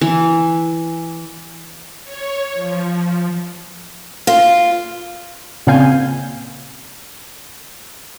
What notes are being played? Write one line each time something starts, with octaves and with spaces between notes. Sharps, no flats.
E3
C#5
F3
F4
A#2 C#3 C4 F5 G#5 G6